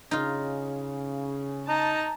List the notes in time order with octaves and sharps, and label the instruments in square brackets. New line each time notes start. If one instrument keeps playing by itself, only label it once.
[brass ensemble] C#3 [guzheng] D#4 F4
[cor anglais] D#4 [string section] A5 A#5